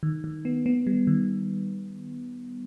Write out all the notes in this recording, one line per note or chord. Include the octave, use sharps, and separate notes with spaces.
D#3
D#3
B3
B3
G3
D#3